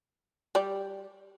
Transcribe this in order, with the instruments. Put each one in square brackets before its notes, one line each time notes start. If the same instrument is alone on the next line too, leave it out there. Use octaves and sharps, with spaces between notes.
[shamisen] G3 G4 D5